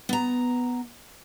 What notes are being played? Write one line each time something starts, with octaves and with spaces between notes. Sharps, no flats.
B3 A#5